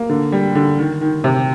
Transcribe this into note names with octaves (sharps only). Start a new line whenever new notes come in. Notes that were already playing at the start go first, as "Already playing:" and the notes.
Already playing: A#3
D3
G3
D3
D#3
D#3
C3